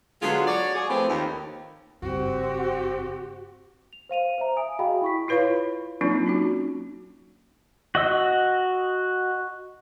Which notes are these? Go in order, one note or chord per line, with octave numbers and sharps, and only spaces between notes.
D3 F#3 G#3 B3 F4
F#4 C#5 D5
G#4
F3 A3 C4 G4 B4
D#2
F#1 G2 C4 F#4 G4
F7
C5 F5 D#7 F7
C5 E5 A#5
E5 G#5 D#6 D7
F#4 G#4 D#5 F5 G5 B5
E4 C#6 B6
E4 F4 B4 C#5 F5 B5
F#3 A#3 C4 D4 D#4 F4
C#4 D#4 F#4
F#4 D#5 E6